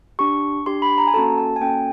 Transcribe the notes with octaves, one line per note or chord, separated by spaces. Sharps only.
D4 G4 C#6
D4 G4 C6
B5
A#5
G#5
A#3 C#4 F#4 A4 A5
A5
G#5
A#3 C#4 F#4 A4 G5